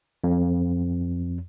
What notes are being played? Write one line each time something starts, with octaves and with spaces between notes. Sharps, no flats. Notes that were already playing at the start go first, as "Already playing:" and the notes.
F2